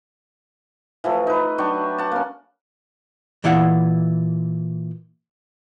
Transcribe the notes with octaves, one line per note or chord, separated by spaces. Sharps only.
E3 F3 A3
D#4 B4
F#3 D4 G5 C#6
F#5 A5
A#3 C#4
A#2 E3 E4 F5 F#5